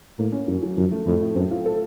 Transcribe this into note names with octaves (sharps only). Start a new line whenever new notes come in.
A2 A#3
C#4
F#2 F#3
F#3
F#2 F3
A3
F2 A2
A2
F#2 C4
F4
A4